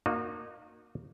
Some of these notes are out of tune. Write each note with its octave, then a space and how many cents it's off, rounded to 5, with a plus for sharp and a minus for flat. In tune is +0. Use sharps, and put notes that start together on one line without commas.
A#3 +0 D#4 -30 F#4 -30